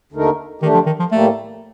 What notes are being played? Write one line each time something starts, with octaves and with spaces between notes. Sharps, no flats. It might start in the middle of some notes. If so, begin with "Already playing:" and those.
D#2 D3 A3 D#4 A#4
D3 D#3 A3 D4 G4
F3
D#3
F3
A2 G3 A3 A#3